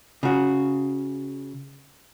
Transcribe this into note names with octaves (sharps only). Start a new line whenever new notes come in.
C#3 F#4